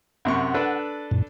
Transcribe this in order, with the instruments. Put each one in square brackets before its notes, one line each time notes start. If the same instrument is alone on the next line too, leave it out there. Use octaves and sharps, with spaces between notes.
[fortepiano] F#2 C3 C#6 [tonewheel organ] F#5
[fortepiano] D4 A4 B4
[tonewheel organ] F#2 A#2